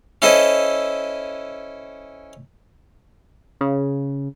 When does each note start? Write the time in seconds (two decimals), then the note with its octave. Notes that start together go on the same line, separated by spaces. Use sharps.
0.22 C#4 E4 A4 C5 D#5
3.61 C#3